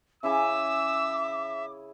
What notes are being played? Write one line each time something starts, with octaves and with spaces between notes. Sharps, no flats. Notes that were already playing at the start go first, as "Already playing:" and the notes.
C#3 E4 G#4 E5 D6 E6